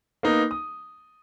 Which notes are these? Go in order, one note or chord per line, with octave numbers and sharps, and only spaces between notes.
A#3 B3 D#4
D#6